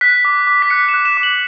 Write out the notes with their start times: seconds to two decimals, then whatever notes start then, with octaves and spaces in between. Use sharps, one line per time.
0.01 F#6 B6
0.25 D6
0.47 D6
0.62 B6
0.70 F#6 C#7
0.89 E7
0.94 F#6
1.05 E7
1.17 D6
1.23 F#7